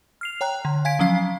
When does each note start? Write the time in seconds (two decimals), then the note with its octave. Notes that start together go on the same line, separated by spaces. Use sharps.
0.21 F6 C7 F7
0.41 C#5 G5 A#5 F#6
0.65 D3
0.85 F5 G#5 G#6 B6 D7
0.99 F3 F#3 C#4 F5 C7